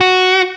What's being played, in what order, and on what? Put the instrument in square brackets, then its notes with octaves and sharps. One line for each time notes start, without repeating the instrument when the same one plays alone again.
[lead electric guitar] F#4